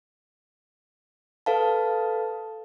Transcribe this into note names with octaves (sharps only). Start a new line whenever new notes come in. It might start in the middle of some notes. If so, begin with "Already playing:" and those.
A4 B4 F5 A5